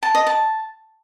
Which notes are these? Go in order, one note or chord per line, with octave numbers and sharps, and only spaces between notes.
A5
D#5
A5